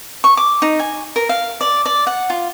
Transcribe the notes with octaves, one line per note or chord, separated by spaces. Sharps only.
C#6
D6
D#4
G#5
A#4
F5
D5
D5
F#5
F4